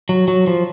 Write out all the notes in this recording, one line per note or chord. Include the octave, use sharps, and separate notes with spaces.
F#3
F#3
F3